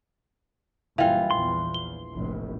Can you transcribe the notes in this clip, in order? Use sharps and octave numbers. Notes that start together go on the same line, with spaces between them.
F#1 A#2 E3 G3 F4 F5 G5
A#1 E2 C6
G7
F1 A#1 A2